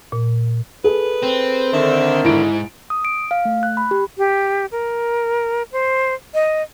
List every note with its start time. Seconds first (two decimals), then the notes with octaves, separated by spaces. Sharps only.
0.12 A#2
0.84 G#4 A4 B4
1.23 C4
1.73 D3 D#3 E5
2.25 G#2 E4 D7
2.90 D#6
3.05 D7
3.31 F5
3.45 A3
3.63 F#6
3.77 B5
3.91 G4
4.18 G4
4.72 A#4
5.72 C5
6.34 D#5